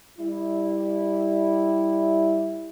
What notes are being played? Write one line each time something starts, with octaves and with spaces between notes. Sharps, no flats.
G3 E4